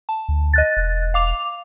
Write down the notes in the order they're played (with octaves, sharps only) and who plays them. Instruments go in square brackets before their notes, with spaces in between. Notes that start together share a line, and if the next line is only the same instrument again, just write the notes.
[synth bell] A5
[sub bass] D2
[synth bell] D#5 F#6 A6
[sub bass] E1
[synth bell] F5 D6 F7